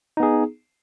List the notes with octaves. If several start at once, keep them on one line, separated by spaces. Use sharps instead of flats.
B3 D#4 G#4